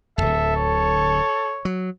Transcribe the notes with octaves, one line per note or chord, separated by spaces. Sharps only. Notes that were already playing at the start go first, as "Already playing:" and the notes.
D1 G#1 A4 E5
C#5
F#3